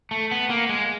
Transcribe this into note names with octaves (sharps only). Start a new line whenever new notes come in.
A3
B3
A#3
G#3